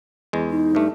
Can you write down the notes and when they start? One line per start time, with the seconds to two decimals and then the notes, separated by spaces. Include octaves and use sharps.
0.33 E2 G#3
0.51 D#4
0.75 G2 A3